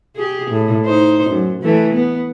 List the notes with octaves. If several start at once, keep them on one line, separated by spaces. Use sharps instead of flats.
G4 G#4
A2
D#4 C5
F#2
E3 A3
B3